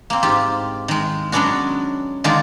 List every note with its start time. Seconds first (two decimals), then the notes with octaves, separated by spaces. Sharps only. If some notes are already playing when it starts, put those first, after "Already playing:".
0.10 A#3 C4
0.23 G#2 F4 G4
0.88 D#3 G#3
1.32 F#3 G#3 B3 C#4 D4 F#4
2.24 D3 D#3 G#3 F4 G#4 D5